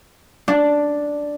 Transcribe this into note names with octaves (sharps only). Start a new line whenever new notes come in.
D4